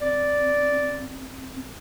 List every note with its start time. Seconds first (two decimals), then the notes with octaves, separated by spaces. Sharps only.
0.02 C4 D5